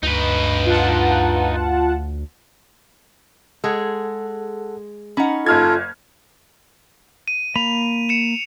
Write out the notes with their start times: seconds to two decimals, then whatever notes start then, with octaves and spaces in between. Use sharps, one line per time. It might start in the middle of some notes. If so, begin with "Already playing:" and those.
0.03 D2 G2 D#4 B4
0.66 F4 F#5 A5
3.64 G#3 G#4 A4 F#5
5.17 C#4 D#4 F#5 A#5 B5
5.46 F#1 F4 A4 F6 G#6
7.28 D#7
7.56 A#3 B5 F7
8.09 C#7 E7